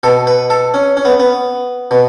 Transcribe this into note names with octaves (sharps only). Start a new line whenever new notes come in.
B2 A4
B4
A4
C#4
C#4
B3
B3
B2